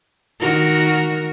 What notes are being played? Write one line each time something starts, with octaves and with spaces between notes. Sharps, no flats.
D#3 F#4 A#4